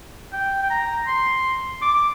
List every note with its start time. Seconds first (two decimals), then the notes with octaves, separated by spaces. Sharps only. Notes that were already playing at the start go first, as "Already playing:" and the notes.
0.33 G5
0.63 G5
0.70 A#5
1.07 C6
1.82 D6